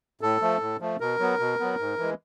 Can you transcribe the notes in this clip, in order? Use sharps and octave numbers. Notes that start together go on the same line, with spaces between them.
A2 A4
F3 A3
A2
F3 A3
B2 A#4
F#3 B3
B2
F#3 B3
G#2
E3 G#3